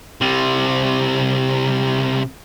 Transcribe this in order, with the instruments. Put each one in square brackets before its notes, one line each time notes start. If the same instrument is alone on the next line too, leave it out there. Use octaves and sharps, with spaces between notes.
[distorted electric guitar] C3 G3